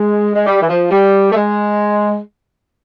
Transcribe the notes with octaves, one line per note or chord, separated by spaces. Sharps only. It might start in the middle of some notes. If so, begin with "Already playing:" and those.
Already playing: G#3
G#3
G3
E3
F3
G3
A3
G#3